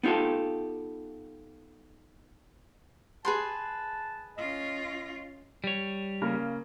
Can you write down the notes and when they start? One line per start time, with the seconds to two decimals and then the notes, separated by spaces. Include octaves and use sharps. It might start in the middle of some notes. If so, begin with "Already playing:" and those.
0.03 B3 D#4 F4 G4 A4
3.25 G#4 B4 A5 C6
4.38 C#4 F4 D#5
5.64 G3 C#5
6.22 C#3 A#3 A#4